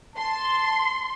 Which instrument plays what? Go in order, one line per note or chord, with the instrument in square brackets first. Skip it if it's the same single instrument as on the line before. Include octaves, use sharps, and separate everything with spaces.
[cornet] A5 [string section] C6